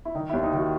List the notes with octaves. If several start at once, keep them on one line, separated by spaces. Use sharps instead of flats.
E4
D#3 D#4
E4
D#2
D#4
D#3 F#4